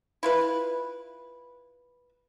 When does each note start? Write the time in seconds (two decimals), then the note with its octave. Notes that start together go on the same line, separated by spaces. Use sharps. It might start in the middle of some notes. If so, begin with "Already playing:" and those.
0.23 E4 F4 B4